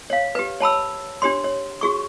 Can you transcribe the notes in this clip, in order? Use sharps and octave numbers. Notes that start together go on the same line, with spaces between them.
C#5 F5
G4 B4
C#5 A5 B5 E6
D4 G4 C#5 C6
C#5
F#4 G#4 C#6